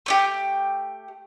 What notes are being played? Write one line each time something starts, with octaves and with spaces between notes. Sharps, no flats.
A3 D4 G4